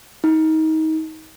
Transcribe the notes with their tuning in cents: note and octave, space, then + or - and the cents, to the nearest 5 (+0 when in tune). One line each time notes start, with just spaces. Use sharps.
D#4 +25